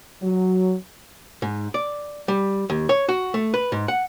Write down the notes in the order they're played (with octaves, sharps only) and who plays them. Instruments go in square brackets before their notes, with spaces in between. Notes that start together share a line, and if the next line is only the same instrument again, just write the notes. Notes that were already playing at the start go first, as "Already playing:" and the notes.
[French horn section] F#3
[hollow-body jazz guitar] G#2
D5
G3
D#2
C#5
F#4
A3
B4
G#2
F#5